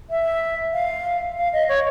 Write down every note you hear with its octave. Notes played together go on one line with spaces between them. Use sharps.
E5
F5
F5
D#5
C#5